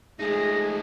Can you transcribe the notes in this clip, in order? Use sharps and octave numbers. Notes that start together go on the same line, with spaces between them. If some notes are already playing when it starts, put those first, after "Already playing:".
G#3 A3 D#4 G#4 A#6